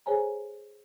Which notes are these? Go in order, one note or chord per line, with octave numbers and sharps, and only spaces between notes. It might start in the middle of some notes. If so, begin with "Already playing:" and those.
G#4 A4 C5 C#5 G#5 A#5